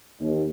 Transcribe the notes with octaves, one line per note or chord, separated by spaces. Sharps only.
D#2